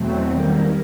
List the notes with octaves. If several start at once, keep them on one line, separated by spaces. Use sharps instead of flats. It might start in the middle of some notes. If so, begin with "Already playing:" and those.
Already playing: E2 B2 F#3 A3 C4
D#3 G3 A#3